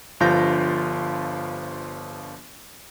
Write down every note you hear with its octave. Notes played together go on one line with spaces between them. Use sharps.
G1 G2 F3 F4 G6 A#6